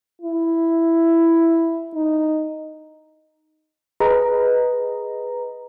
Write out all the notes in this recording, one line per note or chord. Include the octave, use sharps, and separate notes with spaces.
E4
D#4
G#4 B4 D#5 A#5